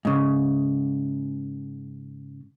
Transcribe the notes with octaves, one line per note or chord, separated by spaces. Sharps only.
G#2 C#3